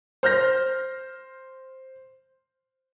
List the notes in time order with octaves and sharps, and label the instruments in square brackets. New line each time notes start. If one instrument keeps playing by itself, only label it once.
[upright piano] C5 F6 G6 A#6